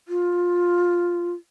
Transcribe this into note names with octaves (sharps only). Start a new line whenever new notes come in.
F4